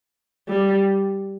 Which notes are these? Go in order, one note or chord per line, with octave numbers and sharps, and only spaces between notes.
G3